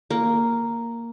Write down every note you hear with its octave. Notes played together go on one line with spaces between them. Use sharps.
A#3